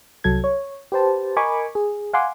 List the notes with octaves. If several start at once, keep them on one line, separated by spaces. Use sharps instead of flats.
C2 F#3 A4 G#6
C#5
G4 B4 C5 A5
A#4 D#5 G#5 B5 C#6 D6
G#4
F5 F#5 G#5 C6 D6